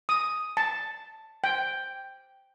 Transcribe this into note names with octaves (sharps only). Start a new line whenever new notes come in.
D#6
A5
G5